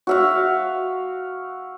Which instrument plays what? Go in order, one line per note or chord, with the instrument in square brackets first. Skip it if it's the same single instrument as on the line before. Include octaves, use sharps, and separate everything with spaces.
[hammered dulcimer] F#4 E5 F5